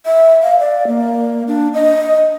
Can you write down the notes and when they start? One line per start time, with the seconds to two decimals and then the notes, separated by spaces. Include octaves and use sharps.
0.06 E5
0.43 F5
0.59 D5
0.87 A#3
1.48 D4
1.74 D#5